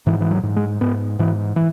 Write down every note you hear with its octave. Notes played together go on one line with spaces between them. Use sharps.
G#2 E3
E3
F#3
G#2
G#3
G#2 B3
G#2 E3
E3